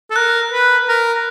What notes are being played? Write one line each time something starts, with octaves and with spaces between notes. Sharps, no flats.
A4
A#4 F#6
B4
A#4